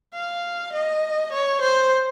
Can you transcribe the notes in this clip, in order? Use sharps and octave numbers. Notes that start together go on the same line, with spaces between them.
F5
D#5
C#5
C5